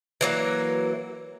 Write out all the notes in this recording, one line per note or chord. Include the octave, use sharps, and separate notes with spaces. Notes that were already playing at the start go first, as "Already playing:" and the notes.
E3 F#3 A#3